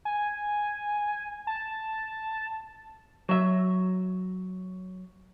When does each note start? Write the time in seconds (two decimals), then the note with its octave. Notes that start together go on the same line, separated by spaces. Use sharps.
0.05 G#5
1.47 A5
3.29 F#3 E5